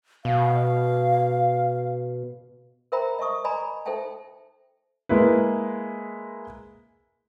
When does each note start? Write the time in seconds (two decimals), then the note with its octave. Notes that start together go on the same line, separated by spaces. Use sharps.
0.25 B2 F5
2.92 A#4 C5 E5 G5 A#5 B5
3.19 D#5 E5 A5 C#6 D#6
3.44 D5 D#5 G#5 A#5 B5
3.86 D#4 A4 C5 E5 G5 A5
5.09 G#3 A#3 E4 B4